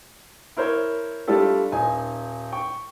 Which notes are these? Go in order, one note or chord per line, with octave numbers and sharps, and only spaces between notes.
E4 A#4 C5 C#5
G3 A3 D4 F4 G4 A4
D#1 D#4 G#5
G5 C#6